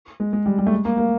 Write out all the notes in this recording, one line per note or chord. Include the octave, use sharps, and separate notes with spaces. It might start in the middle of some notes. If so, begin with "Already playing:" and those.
G#3
G#3
G3
G3
A3
G#3
A#3
A#3